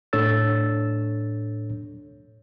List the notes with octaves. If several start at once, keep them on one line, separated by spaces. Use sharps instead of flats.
A2 D4 A4 C#5 E6 A6